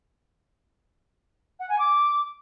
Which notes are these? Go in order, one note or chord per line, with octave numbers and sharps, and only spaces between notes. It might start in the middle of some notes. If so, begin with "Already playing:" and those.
F#5
G#5
D6